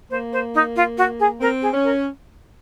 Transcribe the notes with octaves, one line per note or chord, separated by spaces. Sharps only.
A#3 C5
C5
D#4
F4
F#4
G#4
C4 A#4
G#4
C#4
A#4